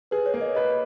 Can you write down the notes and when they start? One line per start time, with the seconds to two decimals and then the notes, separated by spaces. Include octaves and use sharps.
0.11 G#4 B4
0.26 C#5
0.34 A#3
0.41 D#5
0.55 B4 D#5